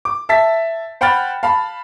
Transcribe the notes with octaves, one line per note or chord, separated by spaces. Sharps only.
D6
E5 A5 A6 B6
C5 F#5 G5 B5 F6 A6
F5 A5 B5